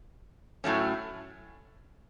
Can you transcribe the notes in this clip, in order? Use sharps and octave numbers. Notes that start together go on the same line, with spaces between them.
A2 F#3 A3 C#4